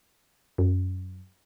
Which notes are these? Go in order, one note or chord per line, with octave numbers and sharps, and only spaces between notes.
F#2